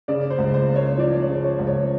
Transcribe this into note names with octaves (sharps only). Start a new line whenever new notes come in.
C#3 D5
C5
C#2
C5
A#3
C#5
F3 D5
C#5
C#3
C#5
C#2
C#5